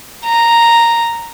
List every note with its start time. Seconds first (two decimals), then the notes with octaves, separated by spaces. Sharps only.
0.26 A#5